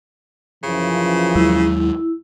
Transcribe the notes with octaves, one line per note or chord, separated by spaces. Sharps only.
F#2 C#3 E3 F3
D#2 F#3 G#3 E4